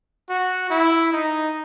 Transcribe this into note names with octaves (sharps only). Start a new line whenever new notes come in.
F#4
E4
D#4